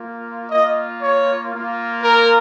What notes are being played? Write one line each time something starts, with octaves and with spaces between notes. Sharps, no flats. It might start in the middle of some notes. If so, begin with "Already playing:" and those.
Already playing: A#3 F4
A#3 F4 D#5
C#5
A#3 F4
A#4